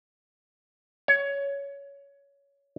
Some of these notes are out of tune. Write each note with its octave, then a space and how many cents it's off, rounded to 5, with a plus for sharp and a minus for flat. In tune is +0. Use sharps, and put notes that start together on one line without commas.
C#5 +15